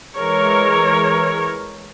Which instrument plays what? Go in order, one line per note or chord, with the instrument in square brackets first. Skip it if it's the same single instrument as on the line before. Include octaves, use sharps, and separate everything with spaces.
[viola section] E3 G#3 A#4 C#5